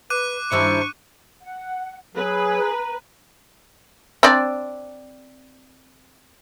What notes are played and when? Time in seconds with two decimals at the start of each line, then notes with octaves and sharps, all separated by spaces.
0.10 B4 D6 F#6 D#7
0.52 G2 D#3 E4 C5 C#6
1.42 F#5
2.15 F#3 G#4 B4
2.61 A#5
4.23 C4 D4 D5